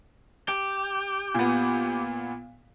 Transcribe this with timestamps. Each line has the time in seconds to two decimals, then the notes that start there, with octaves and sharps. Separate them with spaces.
0.48 G4
1.34 A#2 B3